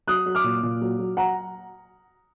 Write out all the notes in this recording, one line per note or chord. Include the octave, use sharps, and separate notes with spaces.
F#3 D#6 F#6
F#3
D6 F6
A#2
A#2
F#3
F#3
F#3 F#5 A#5